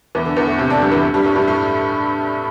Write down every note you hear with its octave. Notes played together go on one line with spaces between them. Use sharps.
E2 E3
D3
E2 E3
A2 A3
C3 C4
D3 D4
G2 G3
E2 E3
G2 G3
A2 A3
G2 G3
A2 A3